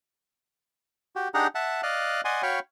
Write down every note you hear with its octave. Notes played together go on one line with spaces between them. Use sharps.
F#4 G4
D4 D#4 G4 G#4 F#5 A#5
E5 F#5 A5
D5 D#5 F5 F#6
D5 D#5 F#5 G#5 C6
F#4 C#5 F5 G5 B5 C#6